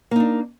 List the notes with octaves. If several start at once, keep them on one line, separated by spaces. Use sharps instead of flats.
A#3 D4 D#4